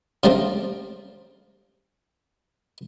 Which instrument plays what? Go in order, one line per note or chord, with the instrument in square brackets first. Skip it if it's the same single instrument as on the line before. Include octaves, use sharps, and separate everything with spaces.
[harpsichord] C#3 G3 A3 A#3 C4 D4